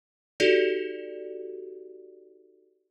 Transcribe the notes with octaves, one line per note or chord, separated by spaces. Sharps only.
D#4 F#4 G4 A4 D5